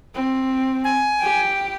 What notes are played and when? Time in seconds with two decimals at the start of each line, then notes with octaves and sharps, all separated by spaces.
0.15 C4
0.84 G#5
1.20 G4 G5